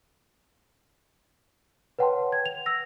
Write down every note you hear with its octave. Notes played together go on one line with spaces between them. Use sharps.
B4 C#5 F#5 G5 A5 C6
G#6
F7
E6 A#6